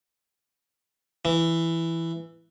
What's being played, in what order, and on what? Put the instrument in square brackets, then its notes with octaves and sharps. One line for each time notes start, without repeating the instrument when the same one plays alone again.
[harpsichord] E3